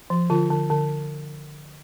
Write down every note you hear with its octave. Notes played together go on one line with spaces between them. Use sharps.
F3
D3 F4
D3
D3